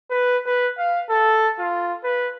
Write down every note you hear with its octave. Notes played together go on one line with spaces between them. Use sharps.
B4
B4
F5
A4
F4
B4